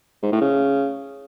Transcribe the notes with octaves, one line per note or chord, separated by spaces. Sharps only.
G#2
A2
C#3